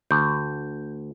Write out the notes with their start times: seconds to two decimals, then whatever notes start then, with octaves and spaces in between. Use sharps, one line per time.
0.11 D2 G6